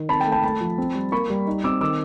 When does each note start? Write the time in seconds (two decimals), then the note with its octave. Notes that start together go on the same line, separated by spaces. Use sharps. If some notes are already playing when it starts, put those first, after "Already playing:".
Already playing: D#3
0.09 C4 A5 B5
0.20 G5 A5
0.26 A3
0.32 G5 A5
0.43 A3 A5 B5
0.61 F3
0.78 C4
0.95 G3
1.12 A#3 B5 C#6
1.30 G3
1.47 D#4
1.64 C4 D6 E6
1.81 D#3 D6 E6